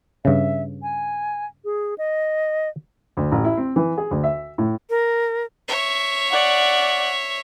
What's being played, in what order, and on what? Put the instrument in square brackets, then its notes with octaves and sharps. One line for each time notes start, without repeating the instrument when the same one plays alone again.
[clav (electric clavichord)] G2 C#3 [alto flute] E5
[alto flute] G#5
G#4
D#5
[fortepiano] D2
A1
E4
C4
E3
G#4
D2
E5
A2
[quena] A#4
[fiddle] C#5 E5
[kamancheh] D5 F#5